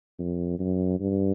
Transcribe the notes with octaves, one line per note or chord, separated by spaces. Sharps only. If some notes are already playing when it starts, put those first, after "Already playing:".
F2
F#2
G2